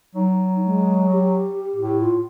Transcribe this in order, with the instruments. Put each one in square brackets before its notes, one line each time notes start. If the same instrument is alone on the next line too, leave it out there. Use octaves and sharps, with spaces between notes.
[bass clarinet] F#3 [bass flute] D#4
[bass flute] G#3
G4
[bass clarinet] A2
[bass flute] F4